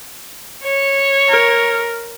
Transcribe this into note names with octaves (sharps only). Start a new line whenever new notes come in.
C#5
A#4